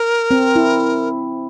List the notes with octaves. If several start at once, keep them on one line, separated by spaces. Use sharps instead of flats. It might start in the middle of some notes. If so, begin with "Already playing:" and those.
Already playing: A#4
C4
E4